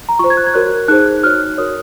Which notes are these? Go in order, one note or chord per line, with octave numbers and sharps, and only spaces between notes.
A#5
F4 C5 C#6
G#6
F#6
G#6
F#4 A#4 C#5 F#6
D#4 G#4 C5 F#6
F#6
F#4 C#5 F6
F#4 A#4 C#5 D#6